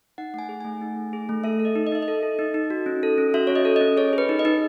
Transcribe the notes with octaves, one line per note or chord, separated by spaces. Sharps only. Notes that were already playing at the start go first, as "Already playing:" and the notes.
D#4 F#5
A3 F#5 G#5
G#4
A3 G#5
D#4
A3
G#4
A3
A4 E5
A4
D#5
D#4
D#5
D#4 E5
D#5
A4
A4
D#4
D#4
F#4
C#4
A4
C#4
F#4 E5
C#4 C#5
D#5
A4
C#4 D#5
G#4 C#5
G#4 B4
D#4
D#5
D#4